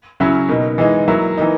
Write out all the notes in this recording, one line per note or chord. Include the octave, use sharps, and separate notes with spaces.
C#3 F#3 C#4 E4
B2 A#3 D#4
E3 G#3 D#4
F#3 A#3 E4
E3 A#3 D#4